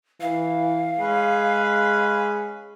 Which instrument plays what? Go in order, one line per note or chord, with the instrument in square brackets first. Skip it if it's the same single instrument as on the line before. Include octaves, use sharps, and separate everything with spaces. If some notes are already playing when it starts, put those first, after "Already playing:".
[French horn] E3 [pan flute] F5
[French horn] G#3 [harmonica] C#4 G#4 B4